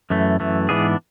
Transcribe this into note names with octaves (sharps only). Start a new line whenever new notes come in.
F#2 E3 A3
F#2 E3 A3
G#2 E3 B3 D4 G#4